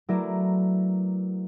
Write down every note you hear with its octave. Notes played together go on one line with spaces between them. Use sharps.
F#3 A3 E4 A#4 B4 D5